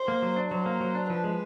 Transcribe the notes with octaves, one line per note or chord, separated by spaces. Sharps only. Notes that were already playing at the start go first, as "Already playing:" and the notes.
Already playing: C5
A#3
F#3
D4
F#3 C5
A#3
F#3
D4
F3 B4
G#3